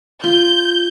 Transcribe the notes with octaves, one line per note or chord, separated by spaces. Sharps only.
F4 G6